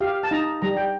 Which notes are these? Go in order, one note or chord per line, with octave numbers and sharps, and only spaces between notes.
G4 F5
A5
D#4 A#5
G3 A#5
G5